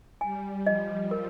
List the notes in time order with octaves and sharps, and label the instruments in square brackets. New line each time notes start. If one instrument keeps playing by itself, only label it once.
[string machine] G3 [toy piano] G#5
[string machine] F3 [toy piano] D#5
[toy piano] A#4